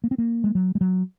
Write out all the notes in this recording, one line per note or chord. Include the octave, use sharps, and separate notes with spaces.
A#3
C4
A#3
G#3
F#3
G#3
F#3